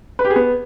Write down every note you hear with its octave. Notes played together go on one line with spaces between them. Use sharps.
B4
G4
G#4
B3